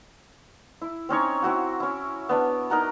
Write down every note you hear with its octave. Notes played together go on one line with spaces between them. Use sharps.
E4
C4 C#4 D#4 C#5
C4 E4 F#4 F#5
C#4 E4
B3 D4 C#5
D#4 A#4 F#5 A#5